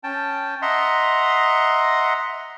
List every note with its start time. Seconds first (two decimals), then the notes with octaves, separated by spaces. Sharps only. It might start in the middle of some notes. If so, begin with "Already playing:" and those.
0.04 C#4 G5 A5
0.62 D#5 E5 F#5 A#5 C6